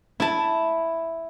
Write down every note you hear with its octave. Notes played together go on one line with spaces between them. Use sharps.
E4 A5